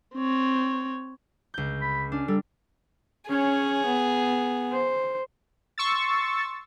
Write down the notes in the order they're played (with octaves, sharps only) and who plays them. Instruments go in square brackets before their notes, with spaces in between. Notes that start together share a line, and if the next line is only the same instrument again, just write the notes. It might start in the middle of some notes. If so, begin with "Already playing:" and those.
[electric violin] C4 C#5
[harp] C#2 G6
[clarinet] B5
[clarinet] C#4 [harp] D4
[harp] G3 [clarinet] A4
[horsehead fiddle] C#4 C#5 [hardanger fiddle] G#4
[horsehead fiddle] B3
C5
[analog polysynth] C6 C#6 E6 A6